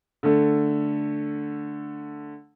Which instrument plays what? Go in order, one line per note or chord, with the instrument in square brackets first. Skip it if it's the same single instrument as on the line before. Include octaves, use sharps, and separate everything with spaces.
[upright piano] D3 A3